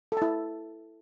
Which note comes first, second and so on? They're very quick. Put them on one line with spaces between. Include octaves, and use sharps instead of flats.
A4 A5 E4